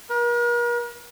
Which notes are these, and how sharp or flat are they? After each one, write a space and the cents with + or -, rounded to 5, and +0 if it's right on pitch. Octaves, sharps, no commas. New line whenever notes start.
A#4 +45